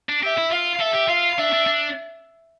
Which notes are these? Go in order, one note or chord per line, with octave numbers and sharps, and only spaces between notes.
D4
G4 E5
E4
F4 F5
A4 E5
G4
F4 F5
D4 E5
D4
D4